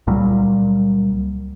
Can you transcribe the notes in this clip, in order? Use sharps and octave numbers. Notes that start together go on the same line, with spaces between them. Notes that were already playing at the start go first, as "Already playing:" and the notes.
C#2 A#2 F#3 G3